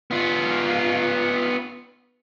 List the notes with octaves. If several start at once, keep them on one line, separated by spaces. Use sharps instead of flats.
B3 F4